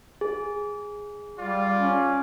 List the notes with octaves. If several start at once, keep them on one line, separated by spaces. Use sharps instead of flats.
G#4
G3 F4 D5
C#4